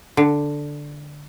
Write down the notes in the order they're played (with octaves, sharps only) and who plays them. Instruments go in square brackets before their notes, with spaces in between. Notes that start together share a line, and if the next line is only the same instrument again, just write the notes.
[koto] D3